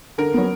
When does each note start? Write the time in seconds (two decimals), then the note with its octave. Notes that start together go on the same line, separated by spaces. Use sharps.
0.18 D3 A#4
0.34 F#3 B3